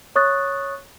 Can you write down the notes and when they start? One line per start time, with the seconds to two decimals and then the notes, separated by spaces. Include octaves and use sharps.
0.16 C#5 C#6 D#6 F#6 A6